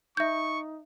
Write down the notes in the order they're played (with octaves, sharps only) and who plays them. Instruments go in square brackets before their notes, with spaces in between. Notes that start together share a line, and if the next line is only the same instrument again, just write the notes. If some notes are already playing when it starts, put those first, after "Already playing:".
[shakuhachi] D#4 [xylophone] E5 G6 [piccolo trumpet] C#6